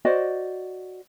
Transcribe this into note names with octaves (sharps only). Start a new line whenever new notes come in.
F#4 C5 D5 D#5